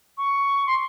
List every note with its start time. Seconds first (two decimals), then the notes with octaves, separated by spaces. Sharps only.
0.17 C#6
0.66 C6